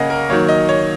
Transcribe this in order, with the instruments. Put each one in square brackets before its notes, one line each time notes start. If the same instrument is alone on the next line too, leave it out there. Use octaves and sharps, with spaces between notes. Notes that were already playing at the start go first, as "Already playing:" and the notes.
Already playing: [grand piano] C#3 A#3 C#4 A#4 D#5 F#5
A#4
D#3 F#3 A#3 C#5
D#5
C#5